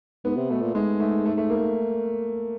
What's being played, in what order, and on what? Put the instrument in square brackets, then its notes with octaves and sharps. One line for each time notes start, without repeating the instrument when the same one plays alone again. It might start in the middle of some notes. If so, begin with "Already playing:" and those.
[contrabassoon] G#2 [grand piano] B3
[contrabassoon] C3
[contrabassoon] B2 [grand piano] A3
[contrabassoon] A#2
[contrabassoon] G#2 [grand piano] G#3
[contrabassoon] G#2 [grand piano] A3
[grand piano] A3
A3
A#3